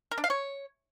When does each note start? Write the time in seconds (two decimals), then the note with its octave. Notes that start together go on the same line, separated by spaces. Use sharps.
0.11 A#4
0.18 D4
0.24 F5
0.30 C#5